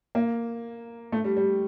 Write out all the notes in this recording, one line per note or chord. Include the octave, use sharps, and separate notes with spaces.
A#3
A3
G3
G3